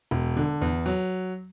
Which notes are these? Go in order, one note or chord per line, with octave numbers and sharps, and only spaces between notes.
E1
D3
E2
F#3